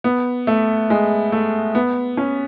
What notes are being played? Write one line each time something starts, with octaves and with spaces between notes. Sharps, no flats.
B3
A3
G#3
A3
B3
C#4